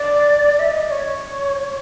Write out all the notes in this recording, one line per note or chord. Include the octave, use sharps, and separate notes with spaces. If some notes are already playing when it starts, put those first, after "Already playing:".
Already playing: D5
E5
D#5
D5
C#5